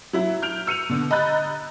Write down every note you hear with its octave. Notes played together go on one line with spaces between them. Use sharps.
F#3 E4
F6 G6 D7 F7
E6 C#7 D#7 F7
B2 D3
D#5 A#5 B5 F#6 G6 A6